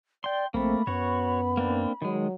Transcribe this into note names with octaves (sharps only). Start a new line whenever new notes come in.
D5 G5 C6
A#1 A3 A#3 C4 B5
F#2 B3 F#4 C#5
A#3 C4 D4
D#3 F#3 G#3